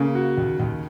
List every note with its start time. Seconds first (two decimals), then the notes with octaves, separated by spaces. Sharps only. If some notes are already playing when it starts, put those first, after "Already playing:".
Already playing: C#3 A#3
0.15 F#4
0.38 D#2
0.60 D#2